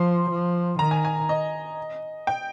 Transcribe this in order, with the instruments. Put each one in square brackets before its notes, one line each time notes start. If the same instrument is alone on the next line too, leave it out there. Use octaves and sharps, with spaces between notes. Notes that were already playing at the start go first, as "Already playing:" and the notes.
Already playing: [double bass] F3 [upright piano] C6
[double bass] F3
[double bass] D#3 [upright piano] A#5
[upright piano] G#5
G#5
D#5
G5